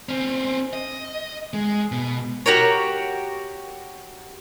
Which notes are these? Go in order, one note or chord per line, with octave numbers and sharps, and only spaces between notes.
C4 C#4
D#5
G#3
B2
F#4 G4 A#4 C#5